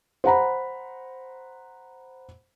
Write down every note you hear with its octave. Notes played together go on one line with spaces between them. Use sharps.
C5 F#5 A#5 B5